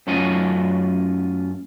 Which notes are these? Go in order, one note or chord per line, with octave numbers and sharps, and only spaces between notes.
F#2 F#3 A3 C#4 F4 D#5